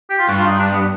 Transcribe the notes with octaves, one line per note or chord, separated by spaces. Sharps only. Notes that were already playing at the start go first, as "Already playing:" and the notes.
G4
F4
G2 F#4
F4
D#4
D4
B3